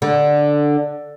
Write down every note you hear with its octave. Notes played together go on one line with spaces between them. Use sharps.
D3